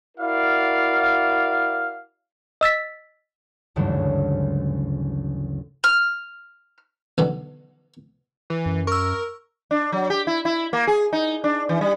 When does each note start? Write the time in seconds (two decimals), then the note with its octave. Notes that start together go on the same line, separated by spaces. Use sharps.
0.18 E4 F#4 A#4 D5 F5
2.61 D#5 E6 A6 B6
3.76 G#1 D2 G2 C#3 E3 F#3
5.84 F6
7.18 B1 B2 D3
8.50 E3
8.66 F#2
8.87 A#4 C#6 E6
9.71 D4
9.92 F#3
10.10 G4
10.27 E4
10.45 E4
10.73 A#3
10.87 G#4
11.13 D#4
11.44 D4
11.69 E3
11.81 G3